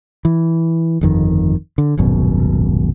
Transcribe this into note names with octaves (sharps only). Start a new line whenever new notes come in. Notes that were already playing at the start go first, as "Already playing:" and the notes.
E3
G1 F2 D#3
D3
D#1 G#1 F#2 B2